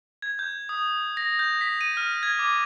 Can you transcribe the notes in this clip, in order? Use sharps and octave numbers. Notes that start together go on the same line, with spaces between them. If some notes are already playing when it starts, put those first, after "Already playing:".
G#6
G6
D#6
A#6
G6
B6
D#7
F6
G#6
D6